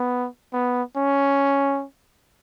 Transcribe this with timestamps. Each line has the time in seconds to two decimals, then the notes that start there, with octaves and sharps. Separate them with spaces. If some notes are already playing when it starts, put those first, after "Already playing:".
Already playing: B3
0.53 B3
0.96 C#4